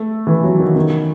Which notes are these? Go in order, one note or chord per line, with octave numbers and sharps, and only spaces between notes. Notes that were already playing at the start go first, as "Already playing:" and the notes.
Already playing: A3
E3
F#3
D#3
D#3